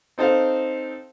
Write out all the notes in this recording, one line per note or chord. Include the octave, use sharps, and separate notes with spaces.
C4 D#4 A4 C5 F5